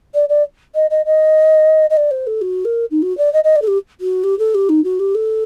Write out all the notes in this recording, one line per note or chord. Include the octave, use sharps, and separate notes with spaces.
D5
D5
D#5
D#5
D#5
D#5
D5
C5
A4
F#4
A#4
D#4
F#4
D5
D#5
D#5
D5
A4
G4
F#4
G4
A4
G4
D#4
F#4
G4
A4